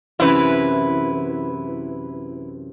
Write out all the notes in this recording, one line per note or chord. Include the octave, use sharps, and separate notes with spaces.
F#2 C3 E3 E4 B4